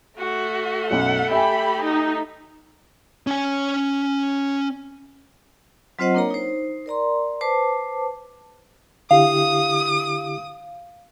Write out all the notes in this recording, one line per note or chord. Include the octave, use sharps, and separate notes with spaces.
A3 F#4
B1 F#2 F#5
G4 E5 G5 G#5 B5
D#4
C#4 G#5
F#3 C4 F4 C5 D#5 F#5
A#3 D4 A#4 C#5 A#5
D#4 C5
A#4 D5 A#5 C6
B4 C5 A5 D6
D3 E4 G4 F5 D#6